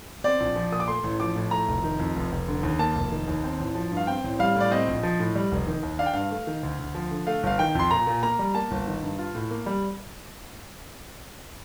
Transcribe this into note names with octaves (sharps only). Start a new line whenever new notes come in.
C4 D5
A#1
F3
A#2 D#6
D6
A3 C6
A1
F3 D6
A2
A3 A#5
F1
D#3
F2
F1
F1
D3
D#2
A#3 A5
F1
D#3
D#2
C4
A1
F3
G2
F5
C4 G5
A1
G3 F5
A2
D5
C4 D#5
A#1
F3
A2
G3
F1
D#3
D#2
D4 F5
G5
G2 F5
A3
D#3
D2
D2
F3
D3
A3 F5
G1 F5
D#3 G5
F2 C6
A#2 A#5
A#2
A#3 A#5
G3
A#3 A5
G1
D#3
G2
F4
A2
A#3
G3